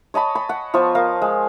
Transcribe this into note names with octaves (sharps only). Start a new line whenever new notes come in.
C#5 D#5 A5 B5
B5
F#5
F3 B3 A5 C#6
A#4 F5
G#3